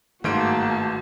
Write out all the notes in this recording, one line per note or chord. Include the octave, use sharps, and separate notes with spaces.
G1 G#2 D#3 A3 A#3 F#4 A5 D7